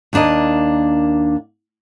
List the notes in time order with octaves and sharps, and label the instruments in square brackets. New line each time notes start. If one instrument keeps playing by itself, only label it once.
[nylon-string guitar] D#2 A#3 D4 A#4 D#5